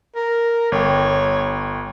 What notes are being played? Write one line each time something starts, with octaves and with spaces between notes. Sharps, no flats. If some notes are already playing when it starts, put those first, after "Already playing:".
A#4
G1 C#5 G5